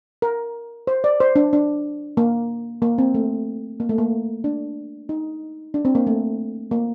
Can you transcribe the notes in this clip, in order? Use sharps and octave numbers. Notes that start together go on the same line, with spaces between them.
A#4
C5
D5
C5
D4
D4
A#3
A#3
C4
A3
A#3
A3
A#3
D4
D#4
D4
C4
A#3
A3
A#3